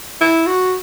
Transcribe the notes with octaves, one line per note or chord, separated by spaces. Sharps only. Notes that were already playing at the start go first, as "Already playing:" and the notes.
E4
F#4